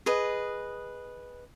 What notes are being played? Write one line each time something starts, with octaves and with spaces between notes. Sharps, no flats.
G#4 B4 D#5